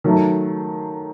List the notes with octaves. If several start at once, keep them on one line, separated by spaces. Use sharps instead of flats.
D#3 F#3 A3